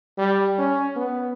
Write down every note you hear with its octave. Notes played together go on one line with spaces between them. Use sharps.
G3
C#4
B3